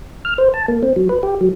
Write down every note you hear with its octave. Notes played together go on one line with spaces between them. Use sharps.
F6
C5
A5
A#3
C4
F#3
B4
G4
F#3